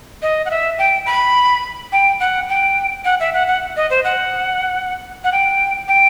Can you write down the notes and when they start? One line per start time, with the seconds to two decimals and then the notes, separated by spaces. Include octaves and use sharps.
0.22 D#5
0.45 F#5
0.51 E5
0.79 G5
1.06 B5
1.92 G5
2.20 F#5
2.49 G5
3.05 F#5
3.20 E5
3.34 F#5
3.47 F#5
3.76 D#5
3.90 C5
4.04 F#5
5.24 F#5
5.32 G5
5.88 G5